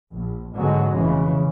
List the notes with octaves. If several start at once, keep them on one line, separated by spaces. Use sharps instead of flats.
A#1
G#2 B2 D3 F#3 G#3
F1 C#3 E3